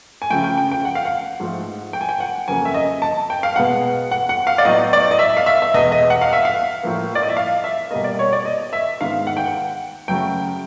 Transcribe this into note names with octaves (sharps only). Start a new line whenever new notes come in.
G#5
C#3 F3 A3 G5
G5
G5
G5
F#5
F5
F#5
G#2 F3 A3
G5
G#5
G5
F#5
F2 C#3 F#3 A#3 G#5
E5
D#5
A5
G5
F5
B2 G#3 B3 F#5
F#5
F#5
F5
D5
A2 F#3 B3 D#5
D5
D#5
E5
F5
E5
E5
E2 B2 G#3 B3 D#5
D#5
F#5
F5
E5
F5
A2 F3 A#3
D5
D#5
E5
F5
E5
B2 G3 A#3 D#5
D5
C#5
D5
D#5
E5
G#2 D#3 G#3 B3 F5
F#5
G5
F#5
F#2 C#3 F#3 A3 G5